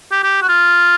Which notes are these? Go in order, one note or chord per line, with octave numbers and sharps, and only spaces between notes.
G4
G4
F#4
F4